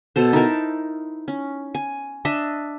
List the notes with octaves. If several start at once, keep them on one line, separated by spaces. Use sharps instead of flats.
B2 A4 C5
D#4 E4 A#4 A5
C#4
G#5
D4 D#5 E5